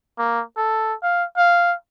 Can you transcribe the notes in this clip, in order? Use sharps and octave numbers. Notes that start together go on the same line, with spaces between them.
A#3
A4
F5
F5